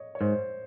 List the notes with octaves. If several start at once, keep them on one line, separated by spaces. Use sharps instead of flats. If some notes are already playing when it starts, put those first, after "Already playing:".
Already playing: C#5 D#5
C#5
G#2 C5